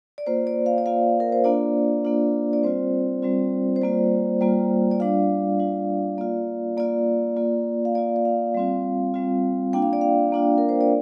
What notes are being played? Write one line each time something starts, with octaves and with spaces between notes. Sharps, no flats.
D5
A#3 F4 C5
D5
F5
D5
A#3 F4 F5
A#4
C5
A#3 D4 F4 D5
A#3 D4 F4
D5
G3 C4 F4 C5
G3 C4 F4
C5
G3 A#3 F4 D5
G3 A#3 F4
D5
G3 D4 F4 F5
G3 D4 F4
A#3 F4 D5
A#3 F4 D5
A#3 F4
F5
A#3 F4 D5
D5
F5
G3 C4 F4
G3 C4 F4
A#3 D4 F4 G5
F5
D5
F5
A#3 D4 F4
A#4
C5
D5